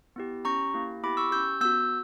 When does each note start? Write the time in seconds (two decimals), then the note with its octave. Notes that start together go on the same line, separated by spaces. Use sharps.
0.16 B3 E4 G4
0.45 C#4 G4 A#5 C#6
0.74 A#3 E4 G4
1.03 B3 E4 G4 B5 D6
1.17 C#6 E6
1.31 C#4 G4 E6 G6
1.61 B3 E6 G6
1.65 F#4